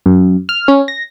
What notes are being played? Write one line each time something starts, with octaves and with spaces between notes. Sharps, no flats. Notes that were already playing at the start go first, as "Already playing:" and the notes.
F#2
F6
C#4
A#6